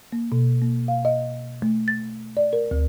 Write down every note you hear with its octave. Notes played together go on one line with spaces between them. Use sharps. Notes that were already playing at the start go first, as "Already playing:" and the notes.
A#3
B2
A#3
F5
D#5
A3
A6
D5
A#4
D2